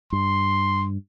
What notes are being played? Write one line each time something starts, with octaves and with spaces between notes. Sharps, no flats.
G2 C6